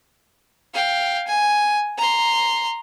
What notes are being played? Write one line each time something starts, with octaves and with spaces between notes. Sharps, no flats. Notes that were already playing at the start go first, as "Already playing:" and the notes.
F5 G5
G#5
A#5 C6